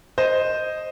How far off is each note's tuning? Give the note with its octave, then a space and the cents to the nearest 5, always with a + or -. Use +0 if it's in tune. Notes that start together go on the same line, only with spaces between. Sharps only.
C5 +0 D#5 +0